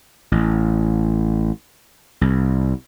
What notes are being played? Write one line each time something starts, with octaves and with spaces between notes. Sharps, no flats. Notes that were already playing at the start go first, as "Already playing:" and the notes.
A1
C2